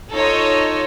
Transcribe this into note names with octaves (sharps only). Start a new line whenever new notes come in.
D#4 F4 A4 C#5 D#5